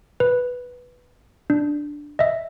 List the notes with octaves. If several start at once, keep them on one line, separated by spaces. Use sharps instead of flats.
B4
D4
D#5 E5